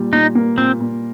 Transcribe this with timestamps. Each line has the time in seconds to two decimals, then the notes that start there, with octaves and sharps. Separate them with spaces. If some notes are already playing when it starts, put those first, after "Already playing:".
Already playing: A#2 G3
0.13 A#2 D#4
0.35 A#3
0.57 A#2 C4
0.80 A#2